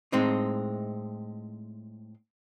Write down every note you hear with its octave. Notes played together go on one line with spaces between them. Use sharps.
A2 G#3 C4 D#4